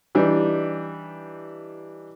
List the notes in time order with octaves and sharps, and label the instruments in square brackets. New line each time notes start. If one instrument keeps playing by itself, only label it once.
[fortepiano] E3 G3 D4 D#4